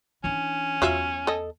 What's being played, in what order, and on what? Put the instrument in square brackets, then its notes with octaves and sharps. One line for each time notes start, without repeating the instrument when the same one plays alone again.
[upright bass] E3 D4 [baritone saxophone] C#4
[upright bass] E2 [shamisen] F#3 F4 E5
[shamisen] A4 D#5